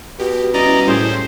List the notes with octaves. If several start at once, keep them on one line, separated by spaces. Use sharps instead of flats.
B2 G4
G3 C#4 E4 D5 D#5 A#5
A2 G#4 C5 G5